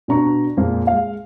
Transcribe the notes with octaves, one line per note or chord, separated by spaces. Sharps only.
B2 D4 A#5 C#6
F2 A#2 G#3 A#3
G#3 F5